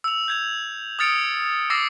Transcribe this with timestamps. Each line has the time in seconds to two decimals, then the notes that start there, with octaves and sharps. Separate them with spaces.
0.04 E6 F7
0.28 G6 G#6 F7
0.99 D#6 F6 A6 C#7 D7
1.70 D6 E6 A6 A#6 C7 C#7